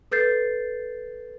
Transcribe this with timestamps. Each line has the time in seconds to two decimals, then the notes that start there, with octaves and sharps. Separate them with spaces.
0.12 A4 B4 G6 A6 C7